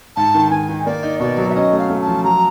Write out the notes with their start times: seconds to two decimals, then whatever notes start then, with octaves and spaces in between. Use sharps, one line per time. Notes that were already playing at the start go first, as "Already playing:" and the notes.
0.16 G#2 A5
0.34 D#3
0.51 D#3 G#5
0.69 D#3
0.86 A#3 D5
1.03 D#4
1.20 B2 D5
1.38 F#3
1.50 E5
1.55 C#4 D#5
1.72 A3
1.78 F5
1.90 A3
2.01 A5
2.07 F3
2.24 F#3 A#5